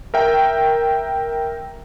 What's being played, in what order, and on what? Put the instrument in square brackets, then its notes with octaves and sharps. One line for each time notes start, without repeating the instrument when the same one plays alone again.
[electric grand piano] A#4 E5 G5